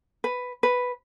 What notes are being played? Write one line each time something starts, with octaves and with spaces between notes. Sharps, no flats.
B4
B4